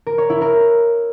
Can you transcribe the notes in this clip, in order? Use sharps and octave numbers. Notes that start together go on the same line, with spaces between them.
A#4
C#5
E4
A#4